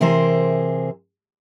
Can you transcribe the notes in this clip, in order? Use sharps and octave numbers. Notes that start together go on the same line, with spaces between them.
C3 E3 G#4 A#4 C5